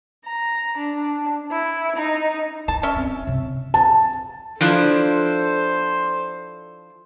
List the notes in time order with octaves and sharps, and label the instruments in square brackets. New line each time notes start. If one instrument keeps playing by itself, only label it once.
[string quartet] A#5
D4
E4
D#4
[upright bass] E4 [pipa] A5
[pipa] C#4 E5
[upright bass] C4
C3 E3
[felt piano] A5
[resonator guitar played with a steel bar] F3 D4 E4 [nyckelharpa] A4 C5